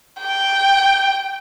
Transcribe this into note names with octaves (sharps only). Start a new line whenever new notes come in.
G5